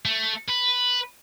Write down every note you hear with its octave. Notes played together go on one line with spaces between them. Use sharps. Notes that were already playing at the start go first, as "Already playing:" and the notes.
A3
B4